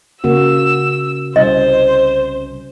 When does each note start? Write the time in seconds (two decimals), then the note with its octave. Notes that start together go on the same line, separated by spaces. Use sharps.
0.24 C#3 A#3 F#4 E6
1.36 C2 C#4 C5 D#5